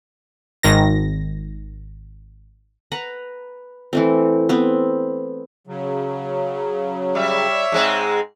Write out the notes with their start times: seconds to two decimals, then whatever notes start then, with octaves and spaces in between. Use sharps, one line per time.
0.63 G#1 D#3 A#6
2.92 B4 F#5 A#5
3.93 E3 A3 C4
4.49 B3 C4
5.67 C#3 F#3
7.15 G3 C#5 D5 E5
7.72 G#2 G#3 C4